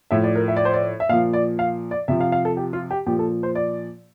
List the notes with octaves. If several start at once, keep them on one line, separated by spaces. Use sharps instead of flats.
A2 F3 E5
D5
A#4
E5
D5
C5
D5
E5
A#2 F3 F5
D5
F5
D5
C3 F3 E5
F5
F5
A4
G4
F4
G4
A#2 F3 G4
A4
C5
D5